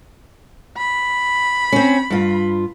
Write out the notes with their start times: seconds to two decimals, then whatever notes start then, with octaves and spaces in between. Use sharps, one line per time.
0.78 B5
1.72 C4 C#4
2.10 G2 F4